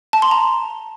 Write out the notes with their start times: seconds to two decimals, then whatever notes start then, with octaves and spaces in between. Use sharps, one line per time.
0.13 A5
0.22 C6
0.31 A#5